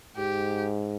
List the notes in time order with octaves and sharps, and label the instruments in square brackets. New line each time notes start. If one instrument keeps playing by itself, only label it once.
[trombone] G#2 [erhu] G4